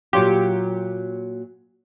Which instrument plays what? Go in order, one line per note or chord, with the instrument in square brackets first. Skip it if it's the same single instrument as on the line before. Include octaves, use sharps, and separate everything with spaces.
[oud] A#2 F#3 F4 [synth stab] G4